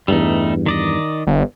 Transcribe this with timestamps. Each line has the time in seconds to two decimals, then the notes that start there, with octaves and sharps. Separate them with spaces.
0.08 E2 G2 G3 A3 D#4
0.66 D#3 D5 D#5
1.27 G1